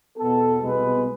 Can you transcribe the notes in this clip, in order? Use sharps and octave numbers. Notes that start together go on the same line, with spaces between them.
E2 B2 B3 A4
C2 B2 G#3 B3 B4